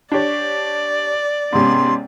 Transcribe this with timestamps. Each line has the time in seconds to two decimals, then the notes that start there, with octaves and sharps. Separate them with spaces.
0.12 D4 G4 C#5 D5
1.53 G#2 C3 B3 C#4 C6